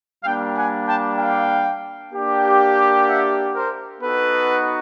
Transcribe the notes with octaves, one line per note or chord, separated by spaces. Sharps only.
G3 A#3 D4 F5 G5
F#5 G#5
G5 A5
F5 G5
A#3 D4 G4
E5 F#5
A#4 C5
B3 D#4 F#4 A4 B4